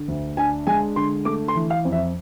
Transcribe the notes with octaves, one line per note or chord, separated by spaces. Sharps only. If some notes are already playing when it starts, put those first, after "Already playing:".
Already playing: D3
D2
D4 G#5
G#3 G#5
D3 C6
A3 D6
C6
E3
F5
F2
E5